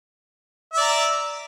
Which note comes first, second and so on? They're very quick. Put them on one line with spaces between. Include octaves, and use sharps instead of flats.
E5 D5 A#5